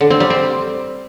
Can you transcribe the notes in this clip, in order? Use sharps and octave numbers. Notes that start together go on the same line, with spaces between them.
D3
C4
G3
C4